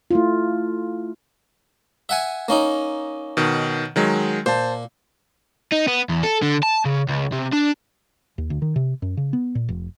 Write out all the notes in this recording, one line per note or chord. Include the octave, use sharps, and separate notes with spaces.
A3 E4 F4
E5 F#5 G#5
A#3 C#4 D#4
B2 D#3
D#3 F#3 G#3
A#2 C5 A5
D#4
B3
E2
A4
D3
A5
C#3
C#2
C3
D4
D#2
D2
D#3
C3
F#2
C#3
B3
A#2
F1